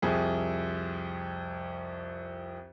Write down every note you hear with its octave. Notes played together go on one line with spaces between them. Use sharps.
C2 F2 G#4